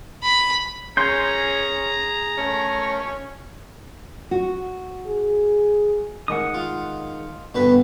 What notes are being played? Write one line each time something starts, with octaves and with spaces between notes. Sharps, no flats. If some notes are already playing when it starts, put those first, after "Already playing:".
B5
C#4 G#4 A#5 C6 G6
A3 C#4
F#4
G#4
D#3 G#3 F#5 D#6
F4
G2 B2 D3 B3 B4